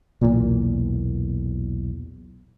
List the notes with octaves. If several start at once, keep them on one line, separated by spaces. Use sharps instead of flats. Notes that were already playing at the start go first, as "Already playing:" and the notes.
B1 E2 A#2